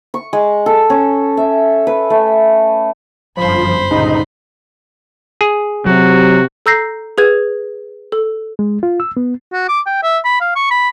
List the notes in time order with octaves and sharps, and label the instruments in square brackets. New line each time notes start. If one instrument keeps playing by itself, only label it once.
[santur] C#6
G#3
A4
C#4
E5
B4
A3
[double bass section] G1 F#2 [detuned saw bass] F3 [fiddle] C5 B5
[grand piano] C#2 [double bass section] G2 A#2 D3 [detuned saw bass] D#4
[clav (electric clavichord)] G#4
[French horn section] C3 [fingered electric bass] F#3 [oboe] F#4
[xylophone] A4 A#5 E6 G6 A#6 C7
G#4 B4 G#6
A4
[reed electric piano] G#3
F4
E6
B3
[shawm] F#4
D6
G5
E5
B5
F5
C#6
B5